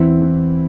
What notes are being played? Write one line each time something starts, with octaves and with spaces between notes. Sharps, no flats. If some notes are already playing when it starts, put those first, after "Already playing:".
Already playing: E2 E3 C4 E4
E3